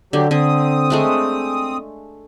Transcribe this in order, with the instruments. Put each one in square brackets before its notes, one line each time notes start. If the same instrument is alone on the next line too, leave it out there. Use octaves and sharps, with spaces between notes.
[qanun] D3 [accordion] F#3 G4
[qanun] D3 [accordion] C4 D#6
[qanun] G#3 A3 D4